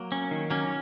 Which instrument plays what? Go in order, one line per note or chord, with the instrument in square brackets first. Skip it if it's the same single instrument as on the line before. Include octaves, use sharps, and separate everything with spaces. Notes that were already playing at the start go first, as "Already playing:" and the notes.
Already playing: [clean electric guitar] F#3 A#3
[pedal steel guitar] C#4
D#3
[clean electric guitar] F#3 A#3 [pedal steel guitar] C#4